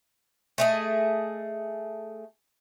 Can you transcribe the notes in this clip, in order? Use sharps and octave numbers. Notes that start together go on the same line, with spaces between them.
A3 G#4 D#5